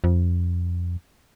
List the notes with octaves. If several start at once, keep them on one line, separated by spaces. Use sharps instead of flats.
F2